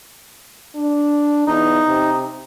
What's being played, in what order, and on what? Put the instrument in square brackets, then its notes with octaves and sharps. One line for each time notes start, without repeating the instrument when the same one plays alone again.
[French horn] D4
[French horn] E2 [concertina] D#4
[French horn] C3